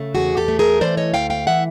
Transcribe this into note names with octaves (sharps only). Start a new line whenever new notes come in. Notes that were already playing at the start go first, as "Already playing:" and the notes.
Already playing: C#3 A3
E2 F#4 G#4
G4 A4
A3
G#4 A#4
E3 C5 D5
C#5 D#5
D2 F5 G5
F5 G5
E3 E5 F#5